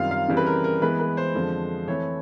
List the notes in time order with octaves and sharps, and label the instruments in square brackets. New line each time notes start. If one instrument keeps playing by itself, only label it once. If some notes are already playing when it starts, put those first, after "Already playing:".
Already playing: [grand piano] F#2 D#3 G3 C4 F4 F5
F5
C#3 E3 G3 C4
B4
A#4
A#4
E3 G#3 B3 B4
B4
C5
F2 D3 F3 G#3
E3 A3 C4 E4 C#5